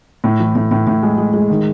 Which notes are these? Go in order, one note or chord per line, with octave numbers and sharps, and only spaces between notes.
A2
E3
A2
A2
A2
G#3
G#3
G#3
D#3